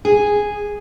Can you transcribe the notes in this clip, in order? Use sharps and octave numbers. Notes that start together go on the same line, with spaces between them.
G#4